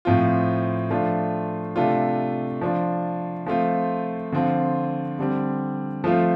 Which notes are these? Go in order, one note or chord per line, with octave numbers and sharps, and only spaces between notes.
A2 F3 C4 F4
F3 A3 D4 F4
C3 A3 D4 F4
F3 D4 F4
F3 A3 C4 F4
D3 F3 C4 F4
D3 G3 C4
F3 A3 C4 F4